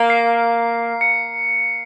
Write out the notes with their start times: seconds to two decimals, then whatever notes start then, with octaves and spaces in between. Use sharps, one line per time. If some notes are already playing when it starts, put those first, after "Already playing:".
Already playing: A#3
0.10 C7
1.01 C#7